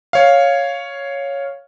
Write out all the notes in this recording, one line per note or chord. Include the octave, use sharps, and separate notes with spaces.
C#5 F5